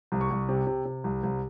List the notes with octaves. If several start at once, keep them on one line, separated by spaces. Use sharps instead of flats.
C2
C#6
C2
C3
C3
C3
C2
C2